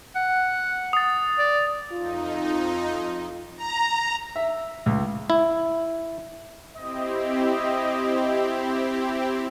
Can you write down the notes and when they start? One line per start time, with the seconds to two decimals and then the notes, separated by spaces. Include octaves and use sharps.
0.16 F#5
0.93 D#6 A6
1.39 D5
1.92 F2 D#4 F4
3.56 A#5
4.36 E5
4.86 C#2
5.30 E4
6.76 C4 E4 G4 D#5